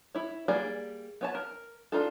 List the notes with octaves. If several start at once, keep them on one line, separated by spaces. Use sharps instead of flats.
E4 C#5
G3 A#3 G#4 D5
B3 C#5 A5
A#4
D4 D#4 F4 A4